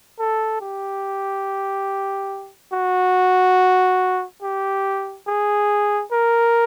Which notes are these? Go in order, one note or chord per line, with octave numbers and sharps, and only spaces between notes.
A4
G4
F#4
G4
G#4
A#4